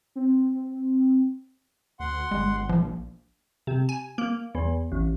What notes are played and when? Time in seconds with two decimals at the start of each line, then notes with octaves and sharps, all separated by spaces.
0.16 C4
2.00 D2 F#5 C6
2.31 G1 G#3
2.69 A#1 F3
3.67 C3
3.89 G#5
4.18 A#3
4.55 E2
4.92 A1